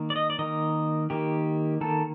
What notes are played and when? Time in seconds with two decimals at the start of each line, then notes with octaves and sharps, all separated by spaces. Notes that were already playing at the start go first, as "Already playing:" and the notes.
Already playing: D#3 A#3
0.10 D5
0.16 D#5
0.30 D5
0.39 D#3 A#3 D#5
1.10 D#3 A#3 G4
1.81 D#3 A#3 A4